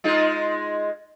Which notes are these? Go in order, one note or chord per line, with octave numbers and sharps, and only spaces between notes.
G#3 D#4 F4